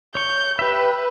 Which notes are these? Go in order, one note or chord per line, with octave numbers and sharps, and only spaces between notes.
C#5 C#6 G6
G4 B4 E5